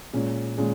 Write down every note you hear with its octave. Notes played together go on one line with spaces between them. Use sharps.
A#2 G#3 C#4
A#2 G#3 C#4